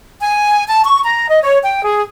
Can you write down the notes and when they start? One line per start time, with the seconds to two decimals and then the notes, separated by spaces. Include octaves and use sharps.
0.20 G#5
0.67 A5
0.85 C#6
1.03 A#5
1.30 D#5
1.42 C#5
1.62 G5
1.84 G#4